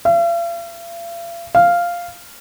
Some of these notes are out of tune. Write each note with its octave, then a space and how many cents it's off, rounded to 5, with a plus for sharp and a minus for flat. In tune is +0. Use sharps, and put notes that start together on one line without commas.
F5 -45
F5 -5